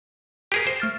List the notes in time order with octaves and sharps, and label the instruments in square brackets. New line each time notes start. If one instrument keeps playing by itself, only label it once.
[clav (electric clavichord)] G4 G#4 A#4
C5
[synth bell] A3 F6 A6